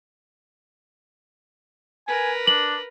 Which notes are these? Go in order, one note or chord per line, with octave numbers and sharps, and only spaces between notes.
A#4 B4 G#5
D4 F#7